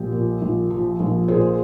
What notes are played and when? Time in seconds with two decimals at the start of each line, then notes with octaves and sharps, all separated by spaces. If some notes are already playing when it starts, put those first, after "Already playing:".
Already playing: A#1 G4
0.12 A#2
0.42 A#1
0.70 F3
1.00 A#1
1.28 A#2 G#4 C5